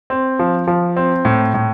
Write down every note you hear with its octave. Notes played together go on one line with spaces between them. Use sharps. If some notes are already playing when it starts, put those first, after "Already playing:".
C4
F3
F3
C4
A2
A2